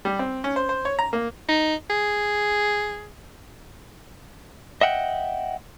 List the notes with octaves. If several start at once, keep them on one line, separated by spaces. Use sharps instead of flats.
G3
C4
C#4
C5
C5
C#5
A#5
A#3
D#4
G#4
D#5 E5 F#5 G5